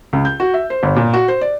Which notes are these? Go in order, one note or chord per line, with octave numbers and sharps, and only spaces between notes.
C#2
G6
F#4
E5
C5
G1
A#2
F#4
C5
D5